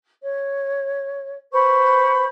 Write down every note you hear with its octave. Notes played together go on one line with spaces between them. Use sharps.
C#5
B4 C5 B5 C#6